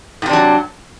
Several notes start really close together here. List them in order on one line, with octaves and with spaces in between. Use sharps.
A2 C3 D4 F#3